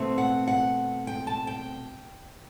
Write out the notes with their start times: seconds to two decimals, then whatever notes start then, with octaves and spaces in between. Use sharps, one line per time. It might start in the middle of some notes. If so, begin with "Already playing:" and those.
Already playing: B2 A3 C4
0.18 F#5
0.47 F#5
1.07 G5
1.27 A5
1.47 G5